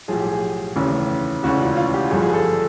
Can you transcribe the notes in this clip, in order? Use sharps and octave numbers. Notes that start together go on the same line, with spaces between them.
B1 A2 F3 G#4
G4
G#4
F1 D#2 C#3 E3
E1 D2 C#3 E3 F#4
F4
F4
G4
G1 G2 D3 F3 G#4
G#4
A4